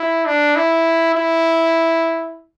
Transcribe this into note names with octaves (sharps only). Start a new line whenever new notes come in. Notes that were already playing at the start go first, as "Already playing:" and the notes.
Already playing: E4
D4
E4
E4